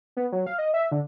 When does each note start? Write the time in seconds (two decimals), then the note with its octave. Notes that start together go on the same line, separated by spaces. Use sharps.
0.17 B3
0.32 F#3
0.47 F5
0.58 D#5
0.74 E5
0.92 D3